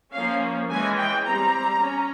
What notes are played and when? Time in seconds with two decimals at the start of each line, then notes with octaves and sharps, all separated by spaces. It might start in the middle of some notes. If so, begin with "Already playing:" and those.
0.12 F3 A#3 C#4 F5
0.69 E3 G#3 C#4 G#5
0.97 G5
1.25 G3 C4 A#5
1.81 C#4